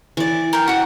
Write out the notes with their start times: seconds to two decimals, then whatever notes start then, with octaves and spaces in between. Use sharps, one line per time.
0.17 E3 D5
0.53 A#4 G5
0.68 F#4 F#5